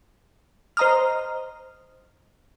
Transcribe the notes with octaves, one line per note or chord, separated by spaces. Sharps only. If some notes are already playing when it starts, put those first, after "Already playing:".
C5 D#5 A#5 D#6 F6